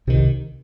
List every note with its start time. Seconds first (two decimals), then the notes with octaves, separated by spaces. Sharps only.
0.07 C2 C3 D#3